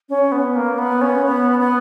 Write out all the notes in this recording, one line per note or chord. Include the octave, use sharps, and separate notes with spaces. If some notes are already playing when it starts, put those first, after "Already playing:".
C#4
B3
A#3
B3
C#4
B3
B3